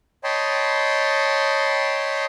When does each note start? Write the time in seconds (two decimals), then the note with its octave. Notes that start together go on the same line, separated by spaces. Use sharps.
0.24 C#5 D#5 G5 A5 B5 C6